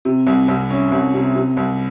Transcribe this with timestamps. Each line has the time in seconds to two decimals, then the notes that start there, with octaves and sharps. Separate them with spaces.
0.05 C3
0.27 C2
0.48 C2
0.70 C#4
0.92 C2
1.14 C3
1.35 C3
1.57 C2